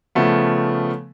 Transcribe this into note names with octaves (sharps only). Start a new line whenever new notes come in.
C#3 F3 A3 B3